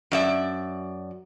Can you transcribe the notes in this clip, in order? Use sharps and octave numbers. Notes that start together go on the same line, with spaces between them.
F#2 D5 E5